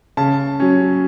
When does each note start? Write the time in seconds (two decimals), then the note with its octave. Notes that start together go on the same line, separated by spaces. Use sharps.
0.17 C#3 A5
0.60 F#3 C#4